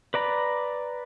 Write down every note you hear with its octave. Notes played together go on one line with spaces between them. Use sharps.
B4 D5 A#5 B5